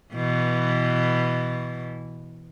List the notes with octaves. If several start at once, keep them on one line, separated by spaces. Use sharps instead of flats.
B2 E3